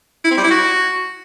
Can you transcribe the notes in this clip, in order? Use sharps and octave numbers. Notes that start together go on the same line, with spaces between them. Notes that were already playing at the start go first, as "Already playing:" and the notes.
E4
C4
G3
E4
F#4